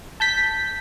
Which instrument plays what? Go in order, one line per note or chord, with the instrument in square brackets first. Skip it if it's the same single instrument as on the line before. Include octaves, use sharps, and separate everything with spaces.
[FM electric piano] A5 G6 B6